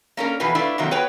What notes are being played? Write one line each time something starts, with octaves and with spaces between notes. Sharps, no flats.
A#3 C#4 D4 A#4
B2 E3 F3 F#4 B4
A3 D4 E4 F4 B4
C3 D#3 F#3 A#3 C4
B3 F#4 B4 C#5 F#5 G5